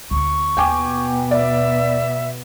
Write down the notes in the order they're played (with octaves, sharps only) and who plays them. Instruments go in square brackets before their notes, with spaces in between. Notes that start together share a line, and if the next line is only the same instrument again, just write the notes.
[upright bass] D2 B3 [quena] C#6
[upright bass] D#2 [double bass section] B2 B3 [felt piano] G5 G#5 D6
[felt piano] D5 [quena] E5